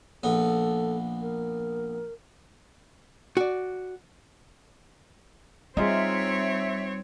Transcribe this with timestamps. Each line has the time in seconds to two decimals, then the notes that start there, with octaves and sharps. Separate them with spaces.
0.23 A#1 B3 A4
1.21 A#4
3.37 F#4 D5
5.77 G3 C4 D#4 F4 G#4 C#5 E5